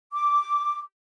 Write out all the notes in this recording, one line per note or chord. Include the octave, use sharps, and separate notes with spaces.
D6